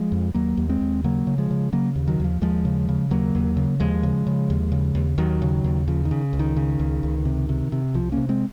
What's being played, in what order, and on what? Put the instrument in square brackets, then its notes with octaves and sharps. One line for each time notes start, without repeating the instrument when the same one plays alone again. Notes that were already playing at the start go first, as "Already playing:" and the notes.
Already playing: [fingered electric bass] F3 G#3
F2
D#2 F#3 A#3
D#2
G#3 C4
D#2
C#3 F#3 A#3
C#3
F3 G#3
C#3
C#3 F#3 A#3
D#2
D#3 F#3
D#2 F3
D#2 F3 G#3
C#3
C#3
D#2 F#3 A#3
D#2
C#3
D#2 F3 G#3
C#3
C#3
D#2
C#3
D#2
D#2 D#3 F#3
C#3
D#2
C#3 F3
D#3
C#3
C#2
D#3
C#3
C#2
C#2
C3
C3
C3
C2 F3
C3 A#3 C#4
G#3 C4